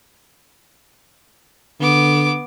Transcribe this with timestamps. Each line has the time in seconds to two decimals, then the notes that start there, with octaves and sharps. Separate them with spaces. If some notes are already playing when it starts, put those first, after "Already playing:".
1.80 D3 B3 D6